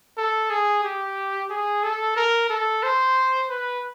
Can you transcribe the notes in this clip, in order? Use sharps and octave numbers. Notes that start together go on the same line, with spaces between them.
A4
G#4
G4
G#4
A4
A#4
A4
C5
B4